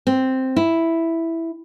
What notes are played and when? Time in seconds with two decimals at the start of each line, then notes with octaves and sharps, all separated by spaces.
0.07 C4
0.56 E4